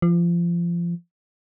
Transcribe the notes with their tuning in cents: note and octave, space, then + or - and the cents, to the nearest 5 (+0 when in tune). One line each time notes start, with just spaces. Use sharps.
F3 -25